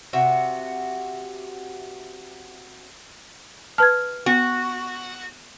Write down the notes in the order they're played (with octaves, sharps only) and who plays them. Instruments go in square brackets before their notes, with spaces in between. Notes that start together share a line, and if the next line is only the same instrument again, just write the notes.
[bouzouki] C3 F#4 E5
[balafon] B4 A5 [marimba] F6 G#6
[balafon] B3 [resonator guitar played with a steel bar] F#4